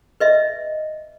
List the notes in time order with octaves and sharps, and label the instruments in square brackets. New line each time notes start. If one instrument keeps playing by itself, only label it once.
[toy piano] B4 D#5 E5